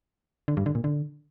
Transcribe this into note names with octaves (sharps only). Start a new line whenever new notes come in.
D3
G2
D3
A#2
D3